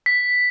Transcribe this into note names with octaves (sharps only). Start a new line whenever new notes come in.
B6